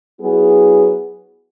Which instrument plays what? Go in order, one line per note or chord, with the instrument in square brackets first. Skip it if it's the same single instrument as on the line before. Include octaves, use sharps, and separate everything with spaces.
[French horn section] F#3 B3 E4 G#4